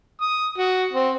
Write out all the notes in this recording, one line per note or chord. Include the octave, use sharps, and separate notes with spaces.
D#6
F#4
C4